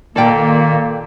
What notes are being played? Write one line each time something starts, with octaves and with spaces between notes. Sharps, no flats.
A#2 D#3 A#3 A4 D5 G5